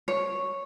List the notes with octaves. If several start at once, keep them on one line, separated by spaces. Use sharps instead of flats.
C#5